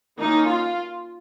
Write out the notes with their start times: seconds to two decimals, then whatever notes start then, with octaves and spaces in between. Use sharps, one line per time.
0.19 D#3 A#3 C#4 D#4
0.48 F4